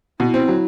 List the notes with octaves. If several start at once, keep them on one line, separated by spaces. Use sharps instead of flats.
B2 E4
C4
F#3